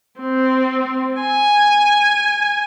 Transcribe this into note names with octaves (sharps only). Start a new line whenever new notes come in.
C4
G#5